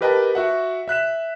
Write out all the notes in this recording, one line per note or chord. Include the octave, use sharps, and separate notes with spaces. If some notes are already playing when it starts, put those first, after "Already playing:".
G4 A#4 B4 D#5 G5 A5
F#4 E5 F#5
E5 F#6 B6 E7